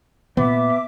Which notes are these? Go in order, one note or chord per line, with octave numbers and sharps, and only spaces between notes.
A#2 B3 E5 D6